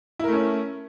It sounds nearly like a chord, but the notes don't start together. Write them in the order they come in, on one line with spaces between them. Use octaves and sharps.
E4 A#4 A3 C#4